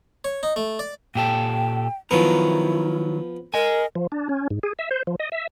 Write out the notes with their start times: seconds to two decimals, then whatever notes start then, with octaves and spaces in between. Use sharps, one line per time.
0.24 C#5
0.43 D#4
0.56 A3
0.79 D5
1.15 A#2 G4 A4 G5
2.11 D#3 F3 F#3 B3 E4 A#4
3.54 A#4 D#5 G#5
3.95 F3
4.12 D4
4.29 C#4
4.51 G#2
4.63 G#4
4.79 E5
4.91 C5
5.07 F3
5.19 D#5
5.32 E5